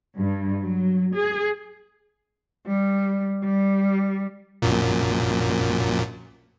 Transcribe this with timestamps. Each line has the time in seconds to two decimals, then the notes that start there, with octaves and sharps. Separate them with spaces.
0.18 G2
0.62 F#3
1.15 G#4
2.67 G3
3.43 G3
4.62 A#1 F#2 A#2